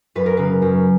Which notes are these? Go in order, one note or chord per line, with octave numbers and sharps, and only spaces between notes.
F#2 B4
A#4
C#3 B4
F#2